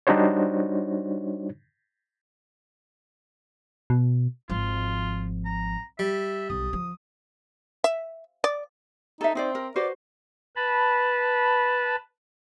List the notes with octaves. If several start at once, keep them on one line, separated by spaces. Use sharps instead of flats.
G3 D4 D#4 F#4 C5 C#5
B2
G#1 F3 F4
A#5
G3 E5
B1 D#6
F3
E5
D5
D#4 A4 E5
C4 D#4 C5 D5
A#4
F#4 B4 C5 D5
B4 A5 B5